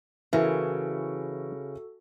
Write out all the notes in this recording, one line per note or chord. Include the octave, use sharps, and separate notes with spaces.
C#3 E3 E4 F#4 A4 A#4 E5